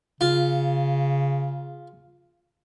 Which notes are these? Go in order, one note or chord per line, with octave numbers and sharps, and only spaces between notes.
C#3 F4